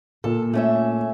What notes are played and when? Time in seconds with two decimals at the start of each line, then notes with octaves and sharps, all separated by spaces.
0.24 A#2 A4
0.54 A3 C#4 E5